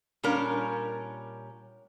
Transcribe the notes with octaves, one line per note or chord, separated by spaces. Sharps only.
A#2 G3 C#4 D4 A#4